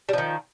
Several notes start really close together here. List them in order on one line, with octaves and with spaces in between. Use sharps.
G3 F3 D#3